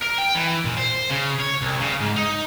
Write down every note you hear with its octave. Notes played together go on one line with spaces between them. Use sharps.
A#4
G5
E3
A#2
C5
C#3
C#5
C2
C#3
G#2
D#4